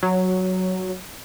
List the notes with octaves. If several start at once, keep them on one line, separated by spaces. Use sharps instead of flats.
F#3